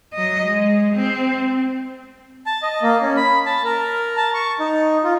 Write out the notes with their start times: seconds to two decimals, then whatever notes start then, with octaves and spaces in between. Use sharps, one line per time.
0.14 F#3 D#5
0.45 G#3
0.94 C4
2.46 A5
2.62 D#5
2.82 A#3
3.01 C#4
3.17 B5
3.46 A5
3.64 A#4
4.17 A5
4.34 C#6
4.60 D#4
5.04 F4